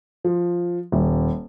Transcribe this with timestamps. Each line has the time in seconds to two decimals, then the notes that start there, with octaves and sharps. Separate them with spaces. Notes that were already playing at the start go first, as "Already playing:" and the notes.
0.24 F3
0.92 D#1